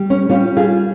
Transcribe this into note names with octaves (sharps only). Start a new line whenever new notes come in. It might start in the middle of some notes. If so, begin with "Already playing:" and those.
Already playing: G3
C#4
G3 C#4 F4
F4 G#4